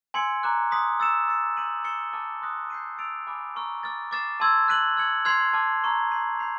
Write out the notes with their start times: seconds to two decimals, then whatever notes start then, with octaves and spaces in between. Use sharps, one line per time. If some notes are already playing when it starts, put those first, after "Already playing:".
0.14 G#5 C6 E6 G#6 C#7
0.43 A#5 D6 F#6
0.71 C6 D#6 F#6 B6
1.00 C6 E6 A6 C#7 E7
1.28 E6 A6 C#7
1.57 G6 B6 D#7 F#7
1.84 E6 A6 C#7 E7 G7
2.13 A5 D6 F6 A6
2.42 C6 D#6 F#6 A#6
2.70 G6 C7 D#7
2.98 E6 A6 D7 F7
3.27 G#5 B5 D6 F6
3.55 A#5 C#6 F6
3.83 D6 F6 A6
4.11 D6 F6 A6 C7 E7
4.40 A5 C6 E6 G#6
4.68 F#6 B6 D#7 F#7
4.97 F6 G#6 C#7 F#7
5.25 C6 F6 G#6 C7 F7
5.53 A5 D6 F6
5.83 A#5 C#6 F6
6.11 G6 C7 D#7 F#7
6.39 G6 C7 F7